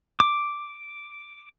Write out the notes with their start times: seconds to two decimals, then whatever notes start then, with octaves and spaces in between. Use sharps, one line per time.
0.20 D6